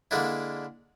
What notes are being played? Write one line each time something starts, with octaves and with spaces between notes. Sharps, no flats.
D3 G#3 A#3 D4 E4